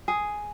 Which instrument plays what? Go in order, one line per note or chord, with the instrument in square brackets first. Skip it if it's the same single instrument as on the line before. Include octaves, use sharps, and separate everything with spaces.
[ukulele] G#4